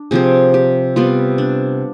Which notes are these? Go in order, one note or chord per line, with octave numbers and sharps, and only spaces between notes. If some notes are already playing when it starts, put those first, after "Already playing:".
Already playing: D4
C3 F3 C4 G#4
G4
C3 G3 B3 F4
D4